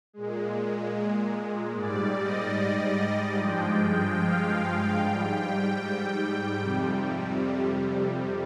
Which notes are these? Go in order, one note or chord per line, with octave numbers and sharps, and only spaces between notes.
A#2 G#3
G#2 G3 D5
D#5
G2 F3 G#3 G5
F5
G#2 G3 G5
F2 C3 G3